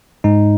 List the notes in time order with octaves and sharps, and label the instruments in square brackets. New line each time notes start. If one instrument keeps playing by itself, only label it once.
[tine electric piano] G#2 D#4